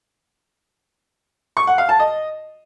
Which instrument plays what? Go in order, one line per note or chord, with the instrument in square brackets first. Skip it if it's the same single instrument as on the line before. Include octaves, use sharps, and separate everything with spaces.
[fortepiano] C#6
F#5
F5
A5
D#5